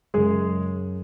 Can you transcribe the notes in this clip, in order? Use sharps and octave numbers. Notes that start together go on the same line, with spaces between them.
F#2 C#3 G#3 G#4